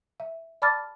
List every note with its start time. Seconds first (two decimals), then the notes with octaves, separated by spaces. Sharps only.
0.20 E5
0.62 D5 A5 B5 D6 F6 A6